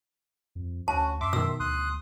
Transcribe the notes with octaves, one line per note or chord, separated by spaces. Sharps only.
F2
D2 C#4 F#4 A5
F#2 E5 C6 D6
B2 D#3 E6
D2 C6 D#6 F#6